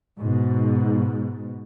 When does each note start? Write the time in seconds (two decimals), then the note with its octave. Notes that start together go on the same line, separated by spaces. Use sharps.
0.19 G#2 B2